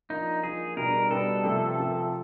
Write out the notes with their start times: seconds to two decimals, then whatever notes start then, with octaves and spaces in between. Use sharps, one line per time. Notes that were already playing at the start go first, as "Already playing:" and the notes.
0.10 F3 A#3 D4 D#4
0.43 F3 A#3 D4 G#4
0.76 B2 G3 B3 D4 A#4
1.10 B2 G3 B3 D4 A4
1.44 C3 F3 A3
1.77 C3 F3 A3